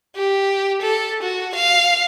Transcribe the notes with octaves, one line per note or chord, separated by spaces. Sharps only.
G4
A4
F#4
F5